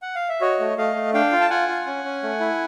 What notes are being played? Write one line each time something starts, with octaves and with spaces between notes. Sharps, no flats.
F#5
F5
E5
F#4 C#5 D#5
A3
A3 D#5 F5
A3
D4 F5 G5
F4
A5
F4 F#5 G#5
F4
C#4
C#4
A3
E4